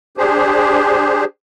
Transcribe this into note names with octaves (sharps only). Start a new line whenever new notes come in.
D4 G4 G#4 C5